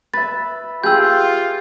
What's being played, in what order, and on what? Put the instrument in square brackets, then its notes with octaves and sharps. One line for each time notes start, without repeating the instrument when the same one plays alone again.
[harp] B4 E5 [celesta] B5 A6
[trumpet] F4 [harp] G4 G#4 G5 [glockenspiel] E6 G6